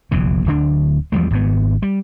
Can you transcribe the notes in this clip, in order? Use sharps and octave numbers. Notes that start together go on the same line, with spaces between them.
F1 A#1 E2 D3
D1 D3 D4
E2 F3 G3 G#3
G#1 G#2 B3
G3